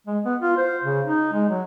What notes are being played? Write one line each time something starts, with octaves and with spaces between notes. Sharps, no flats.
G#3
B3
F4
C5
C#3
D#4
G#3
F#3